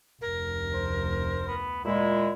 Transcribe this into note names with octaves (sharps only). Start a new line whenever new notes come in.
F1 D2 A#4
C5
B3
A#2 G#3 E4